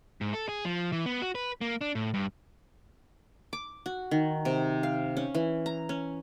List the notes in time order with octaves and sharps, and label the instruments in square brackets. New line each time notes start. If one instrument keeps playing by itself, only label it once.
[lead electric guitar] G#2
A4
G#4
F3
E3
B3
F#4
B4
A#3
D4
A2
G2
[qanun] D6
F#4
D#3
C3
F5
C#4
E3
A#5
C#4